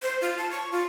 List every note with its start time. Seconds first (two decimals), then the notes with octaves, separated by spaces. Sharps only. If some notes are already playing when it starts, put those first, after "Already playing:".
0.02 C5
0.21 F4
0.38 A5
0.51 C#6
0.72 F4